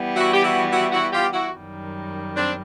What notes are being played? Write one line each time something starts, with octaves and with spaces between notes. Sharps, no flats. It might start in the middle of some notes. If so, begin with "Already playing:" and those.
Already playing: E3 G3 B3
E4 F#4
G4
E4 F#4
E4 F#4
E4 F#4
F4 G4
E4 F#4
F#2 D#3 G3
C4 D4